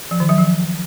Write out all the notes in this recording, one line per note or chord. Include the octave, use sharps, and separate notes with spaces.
F3
D#3
F#3
F3